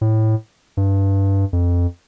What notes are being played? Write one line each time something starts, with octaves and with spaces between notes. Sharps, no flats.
A2
G2
F2